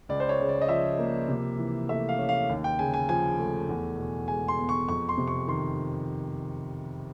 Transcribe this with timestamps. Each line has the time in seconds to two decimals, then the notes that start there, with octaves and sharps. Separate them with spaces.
0.09 C#2 D5
0.20 C5
0.29 C#5
0.40 C#3
0.49 D5
0.61 D#5
0.69 F3 E5
0.99 A#3
1.29 C3
1.59 E3
1.89 A3 E5
2.09 F5
2.18 C#4
2.29 F5
2.49 D#2
2.64 G5
2.79 C#3 G#5
2.94 G#5
3.09 F3 G#5
3.39 A3
3.69 E2
3.98 B2
4.28 G#3 G#5
4.48 C6
4.59 B3
4.69 C#6
4.88 F2 C#6
5.09 C6
5.18 C3
5.28 C#6
5.48 D#3 C6